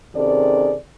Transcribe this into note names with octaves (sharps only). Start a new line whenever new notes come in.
C3 D#3 C#4 G#4 A4 D5